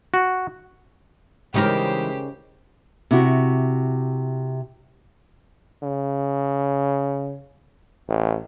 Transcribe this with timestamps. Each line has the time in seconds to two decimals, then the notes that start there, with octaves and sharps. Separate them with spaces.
0.14 F#4
1.54 C#3 E3 G3 G#3 D#4 G4 A#4 C5
3.11 C3 E4 F#4
5.83 C#3
8.09 A1